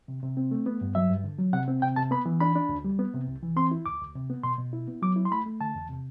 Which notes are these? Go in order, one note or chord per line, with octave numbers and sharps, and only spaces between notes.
C3
C3
C4
A3
B3
G2
F#3 E5
G2
D3
F#3
C3 F#5
C4
C3 G5
C3 A5
B3 B5
E3
D4 B5
D4
D2
G3
B3
C3
C2
E3
C4 C6
E4
D2 D6
D2
C3
B3
B2 C6
B2
E4
B3
F#3 D6
E4
C6
A3 B5
A3
D3 A5
E2
C3